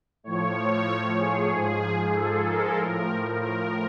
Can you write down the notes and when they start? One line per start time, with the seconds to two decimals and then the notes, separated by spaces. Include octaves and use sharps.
0.24 A2 F3 C#5
1.18 G#4
1.50 G#2 F3
2.14 A4
2.45 A#4
2.77 A2 F3
3.40 A#4